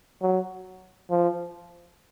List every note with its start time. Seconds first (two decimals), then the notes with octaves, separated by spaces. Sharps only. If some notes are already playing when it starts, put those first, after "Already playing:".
0.22 F#3
1.11 F3